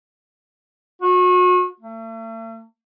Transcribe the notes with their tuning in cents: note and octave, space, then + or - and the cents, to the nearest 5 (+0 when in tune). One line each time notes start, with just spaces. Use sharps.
F#4 -35
A3 +40